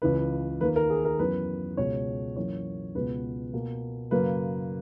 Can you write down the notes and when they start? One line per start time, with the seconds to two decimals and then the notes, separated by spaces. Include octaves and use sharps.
0.02 C#2 C#3 E3 B4
0.60 D#2 D#3 A#3 B4
0.76 A#4
0.90 G#4
1.05 A#4
1.19 F#2 E3 B3 B4
1.77 C#2 B2 G#3 C#5
2.36 F#2 E3 A#3 C#5
2.95 C#2 B2 G#3 B3 B4
3.53 B2 A#3
4.11 F#2 C#3 F#3 A#3 B4